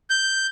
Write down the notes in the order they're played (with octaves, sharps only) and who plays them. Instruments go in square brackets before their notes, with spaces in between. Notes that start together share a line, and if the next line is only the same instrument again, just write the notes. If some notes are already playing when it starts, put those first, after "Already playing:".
[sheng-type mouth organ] G6